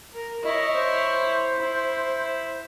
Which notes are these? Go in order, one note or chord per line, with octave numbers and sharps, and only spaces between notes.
A#4
E4 C#5 D#5
C5
E4